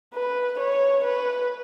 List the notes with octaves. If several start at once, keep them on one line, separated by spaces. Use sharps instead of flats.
B4
C#5
B4